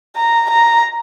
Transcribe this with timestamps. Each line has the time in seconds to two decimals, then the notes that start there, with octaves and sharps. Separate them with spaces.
0.16 A#5
0.50 A#5